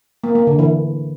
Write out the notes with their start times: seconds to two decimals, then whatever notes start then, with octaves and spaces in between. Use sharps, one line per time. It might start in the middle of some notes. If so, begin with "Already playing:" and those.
0.24 A#3
0.35 A#3
0.47 D3
0.59 E3